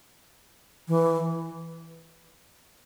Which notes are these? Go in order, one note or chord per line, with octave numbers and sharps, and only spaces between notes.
E3